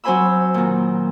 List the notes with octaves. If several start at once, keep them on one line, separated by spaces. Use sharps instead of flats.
F#3 C4 C5 G#5 B5 E6
A#2 D#3